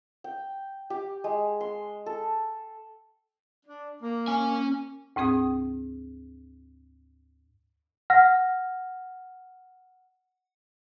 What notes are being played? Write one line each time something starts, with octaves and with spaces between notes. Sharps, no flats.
G5
G4
G#3
C6
A4
D4
A#3
C#4 G#5
D2 G#2 C4 G#4 D#6
F#5 F6 A#6